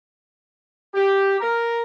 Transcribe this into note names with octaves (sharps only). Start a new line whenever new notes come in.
G4
A#4